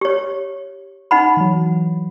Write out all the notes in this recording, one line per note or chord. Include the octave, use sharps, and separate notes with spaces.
G4 C#5
D#4 F#5 B5
E3 F#3